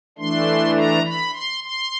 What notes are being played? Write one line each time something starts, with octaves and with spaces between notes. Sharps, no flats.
E3 A3 D4 C6
A#5
B5
C6
C6